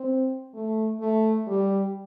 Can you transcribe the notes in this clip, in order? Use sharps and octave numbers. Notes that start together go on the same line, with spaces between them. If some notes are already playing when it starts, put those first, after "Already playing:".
Already playing: C4
A3
A3
G3